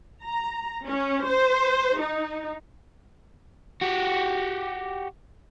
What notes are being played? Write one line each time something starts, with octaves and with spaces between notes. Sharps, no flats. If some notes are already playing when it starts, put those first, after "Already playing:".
A#5
C#4
C5
D#4
F#4 G4